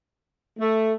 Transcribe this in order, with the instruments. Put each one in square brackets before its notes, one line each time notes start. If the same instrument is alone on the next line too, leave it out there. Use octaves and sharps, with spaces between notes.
[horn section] A3